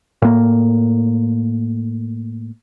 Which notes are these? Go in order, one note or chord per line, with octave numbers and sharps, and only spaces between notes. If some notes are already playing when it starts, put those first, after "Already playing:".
A2 A#3